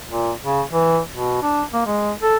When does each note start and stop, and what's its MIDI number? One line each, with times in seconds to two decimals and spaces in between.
0.09 0.32 46
0.43 0.62 49
0.72 1.00 52
1.12 1.41 47
1.42 1.63 62
1.73 1.81 58
1.86 2.12 56
2.22 2.37 69